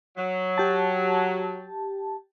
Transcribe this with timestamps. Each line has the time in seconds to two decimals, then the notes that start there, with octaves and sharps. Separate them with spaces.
0.17 F#3
0.58 G4 A5